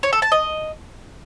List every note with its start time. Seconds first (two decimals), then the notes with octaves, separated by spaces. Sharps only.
0.03 C#5
0.13 A4
0.22 A5
0.32 D#5